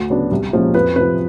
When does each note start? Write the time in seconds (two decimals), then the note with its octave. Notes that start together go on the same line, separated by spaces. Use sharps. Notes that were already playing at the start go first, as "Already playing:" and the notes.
Already playing: D2
0.10 C#3 F#3 B3 D4
0.31 C2
0.53 A#2 F3 G#3 C#4
0.74 F2 B4
0.96 C3 F3 B4